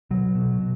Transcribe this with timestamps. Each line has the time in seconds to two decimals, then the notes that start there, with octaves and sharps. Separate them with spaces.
0.11 B2 F#3
0.35 B2
0.60 B2